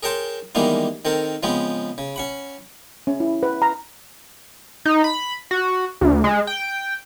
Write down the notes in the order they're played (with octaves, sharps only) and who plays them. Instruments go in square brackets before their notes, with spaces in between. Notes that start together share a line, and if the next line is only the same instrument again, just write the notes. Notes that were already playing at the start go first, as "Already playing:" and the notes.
[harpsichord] G#4 A#4 C#5 G5 A5 C6
D#3 E3 G3 G#3 A#3 B3
D#3 C4 A4 A#4
C#3 F3 G#3 B3 C4
C#3
C#4 F#5 B5
[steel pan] C#4
E4
B4
A#5
[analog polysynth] D#4
B5
F#4
D2
G#3
G5